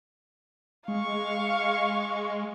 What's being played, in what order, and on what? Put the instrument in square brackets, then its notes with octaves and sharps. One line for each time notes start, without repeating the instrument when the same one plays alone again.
[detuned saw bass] G#3 [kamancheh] F5 C#6